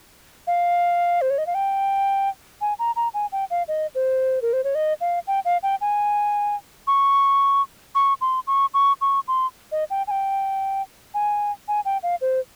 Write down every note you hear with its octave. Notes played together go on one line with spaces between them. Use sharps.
F5
C5
C#5
D#5
F5
G5
G#5
A#5
A#5
G#5
G5
F5
D#5
C5
A#4
C5
C#5
D#5
F5
G5
F5
G5
G#5
C#6
C#6
C6
C#6
C#6
C#6
C6
D#5
G5
G#5
G5
G#5
G#5
G5
F5
C5